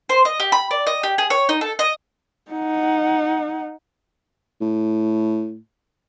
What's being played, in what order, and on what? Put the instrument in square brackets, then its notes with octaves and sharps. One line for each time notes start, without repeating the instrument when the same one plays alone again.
[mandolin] C5
D#5
G4
B5
D5
D#5
G4
G#4
C#5
D#4
A4
D#5
[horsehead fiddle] D#4 F#5
[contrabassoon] A2